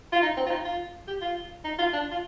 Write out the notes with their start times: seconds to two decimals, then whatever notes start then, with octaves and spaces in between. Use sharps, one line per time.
0.13 F4
0.22 D#4
0.37 C4
0.46 F4
0.51 D#4
0.65 F4
1.08 G4
1.21 F4
1.64 D#4
1.79 F4
1.93 D4
2.11 F4